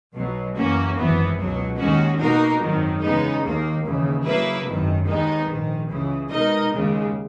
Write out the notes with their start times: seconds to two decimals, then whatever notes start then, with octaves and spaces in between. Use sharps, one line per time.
0.13 B1 B2 F#3
0.55 F#2 E3 A#3 C#4 F#4
0.95 G#1 F#2 E3 B3
1.37 C#2 B2 F#3
1.77 D#2 D#3 G#3 C#4 F#4
2.18 B2 A#3 D#4 F#4 A#4
2.59 G#1 F#2 D#3 F#3
3.01 E2 C#3 G#3 B3 D#4
3.42 D#2 D#3 A#3
3.83 D#2 C#3 E3
4.24 C#3 F#3 A#3 E4 B4
4.65 G#1 F#2 D#3
5.06 D#2 D#3 G#3 B3 D#4
5.47 A#1 G#2 D#3
5.89 C#2 C#3 E3
6.30 B2 G#3 D#4 A#4 D#5
6.71 D#2 C#3 G#3